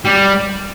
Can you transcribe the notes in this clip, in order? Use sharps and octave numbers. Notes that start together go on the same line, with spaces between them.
G3